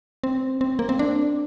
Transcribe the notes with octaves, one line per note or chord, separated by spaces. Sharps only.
C4
C4
A#3
C4
D4